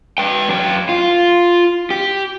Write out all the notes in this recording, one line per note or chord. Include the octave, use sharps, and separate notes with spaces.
B4 G5
F#2 G5
F4
G4